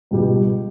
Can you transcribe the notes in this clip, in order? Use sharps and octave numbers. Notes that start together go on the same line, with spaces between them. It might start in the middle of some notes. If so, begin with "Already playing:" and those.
C#2 B2 G3